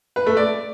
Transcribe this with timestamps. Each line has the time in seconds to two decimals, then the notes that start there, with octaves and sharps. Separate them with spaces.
0.16 B4
0.26 A3
0.37 D5